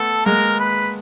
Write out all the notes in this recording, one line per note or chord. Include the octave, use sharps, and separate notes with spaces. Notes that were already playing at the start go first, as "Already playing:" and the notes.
Already playing: A3 B3 A4
G#3 A#3 A#4
B4